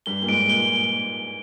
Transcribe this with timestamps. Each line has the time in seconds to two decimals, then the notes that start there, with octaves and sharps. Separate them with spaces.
0.06 G2 G7
0.22 A#2
0.28 G#2 D7
0.49 A#2 G7